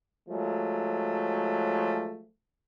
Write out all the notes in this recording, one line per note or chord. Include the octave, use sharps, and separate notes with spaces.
F3 F#3 G#3 A3